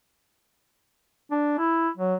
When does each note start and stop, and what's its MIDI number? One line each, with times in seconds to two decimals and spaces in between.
1.31 1.54 62
1.58 1.88 64
1.97 2.15 54